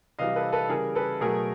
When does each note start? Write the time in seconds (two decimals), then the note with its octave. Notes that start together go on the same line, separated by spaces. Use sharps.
0.19 C3 E3 G3 D#5 F5
0.36 A4 B4
0.52 A4 B4
0.69 C#3 E3 G3 G#4 A#4
0.95 A4 B4
1.21 B2 F#3 A3 G#4 A#4